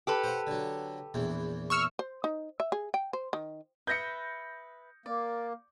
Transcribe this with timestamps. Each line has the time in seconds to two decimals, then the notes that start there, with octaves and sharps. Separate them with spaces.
0.07 G4 A4 B4
0.24 C5 F#5
0.47 D3 F#3
1.14 A#1 E2 E3
1.70 C#6 E6 F6
1.99 C5
2.24 D#4
2.60 E5
2.72 G#4
2.94 G5
3.13 C5
3.33 D#3
3.87 B4 E5 G6 A#6 C#7
5.06 A#3 D5